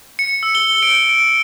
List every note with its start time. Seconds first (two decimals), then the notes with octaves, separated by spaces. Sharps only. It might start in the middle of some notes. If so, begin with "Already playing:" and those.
0.19 C#7
0.43 E6
0.55 G7
0.82 D7
1.09 D7